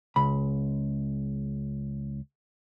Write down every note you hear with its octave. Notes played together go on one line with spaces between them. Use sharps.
C#2 B5